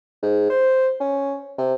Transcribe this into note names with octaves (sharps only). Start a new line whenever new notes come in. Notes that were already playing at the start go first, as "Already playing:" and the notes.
G#2
C5
C#4
C3